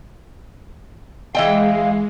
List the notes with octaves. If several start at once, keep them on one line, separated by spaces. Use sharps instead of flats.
E3 G#3 D#5 F5 G5